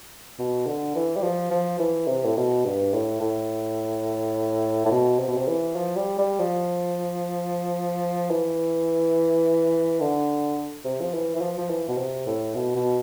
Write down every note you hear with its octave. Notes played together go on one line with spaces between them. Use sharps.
B2
D3
E3
G3
F3
F3
E3
C3
A2
B2
G2
A2
A2
A2
B2
C3
B2
C3
E3
F3
G3
G3
F3
E3
D3
C3
F3
E3
E3
F3
F3
E3
B2
C3
A2
B2
B2